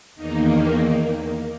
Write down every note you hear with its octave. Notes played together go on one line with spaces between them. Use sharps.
E2 D#3 A#3 D#4